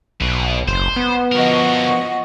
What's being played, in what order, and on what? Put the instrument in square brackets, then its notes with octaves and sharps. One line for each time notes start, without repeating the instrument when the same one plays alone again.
[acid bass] B1 [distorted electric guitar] B2
[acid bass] F#1 [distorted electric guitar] C5
[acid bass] B3
[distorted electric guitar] D3 A#4 [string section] F3 F#4 D#5